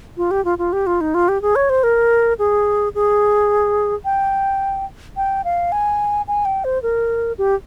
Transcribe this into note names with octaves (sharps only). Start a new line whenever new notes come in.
F4
G4
F4
F4
G4
F4
D#4
F4
G4
G#4
C#5
C5
A#4
G#4
G#4
G5
G5
F5
G#5
G#5
G5
C5
A#4
G4